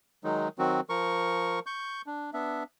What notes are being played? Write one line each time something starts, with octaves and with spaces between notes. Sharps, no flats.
D#3 F#3 G#3 D#4
D#3 F#3 C4 F#4
F3 A#4 C#6
C#6 G6
D4
B3 D4 E5